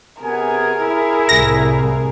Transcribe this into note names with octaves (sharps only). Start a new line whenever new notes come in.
C3 B3 G#4 A#4 G#5
E4
C2 A2 A#6